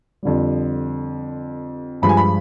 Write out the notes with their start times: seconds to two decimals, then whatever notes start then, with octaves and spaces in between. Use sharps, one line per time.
0.23 F2 D3 G3
2.02 G2 F3 G#3 B5
2.09 G#5
2.17 B5